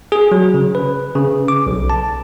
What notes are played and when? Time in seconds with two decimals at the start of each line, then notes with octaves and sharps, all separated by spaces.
0.12 G#4
0.32 F#3
0.54 C#3
0.75 B4
1.15 C#3
1.48 D6
1.67 B1
1.90 A5